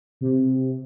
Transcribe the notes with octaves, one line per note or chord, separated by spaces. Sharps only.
C3